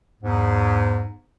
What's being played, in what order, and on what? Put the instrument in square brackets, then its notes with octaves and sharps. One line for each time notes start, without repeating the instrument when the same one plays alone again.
[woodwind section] E2 G#2